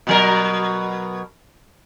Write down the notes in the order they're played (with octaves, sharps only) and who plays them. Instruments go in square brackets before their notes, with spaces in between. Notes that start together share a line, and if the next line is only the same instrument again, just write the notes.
[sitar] B2 F#3 A#4